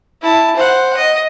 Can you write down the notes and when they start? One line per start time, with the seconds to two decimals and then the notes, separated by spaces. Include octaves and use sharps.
0.22 E4 A5
0.56 C5 F#5
0.97 D#5